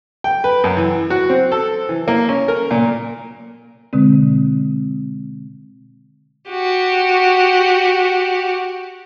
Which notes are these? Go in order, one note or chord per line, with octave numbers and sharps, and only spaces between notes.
G5
B4
F#2
E3
F#4
C4
A4
E3
A#3
C#4
A#4
A#2
B2 D3 G#3 C4
F#4 G4